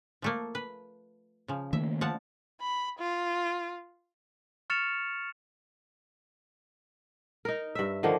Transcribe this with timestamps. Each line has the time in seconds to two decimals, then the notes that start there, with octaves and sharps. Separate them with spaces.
0.22 F3 A3 A#3
0.55 B4
1.48 C#3 F3
1.73 D#3 A3 A#3 E5
2.01 F3 F#5 A5
2.61 B5
2.99 F4
4.70 C#6 F6 A6 C#7 E7 F7
7.45 D#4 A#4
7.75 G2 E5
8.03 D3 D#3 F3 A#3